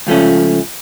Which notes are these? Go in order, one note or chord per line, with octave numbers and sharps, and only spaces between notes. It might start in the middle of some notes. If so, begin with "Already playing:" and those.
C#2 F3 A3 C#4